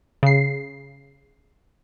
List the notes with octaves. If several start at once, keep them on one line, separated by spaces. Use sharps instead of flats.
C#3 C7